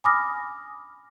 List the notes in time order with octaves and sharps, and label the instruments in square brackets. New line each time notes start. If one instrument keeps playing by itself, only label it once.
[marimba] G#5 B5 D6 D#6 F6 A#6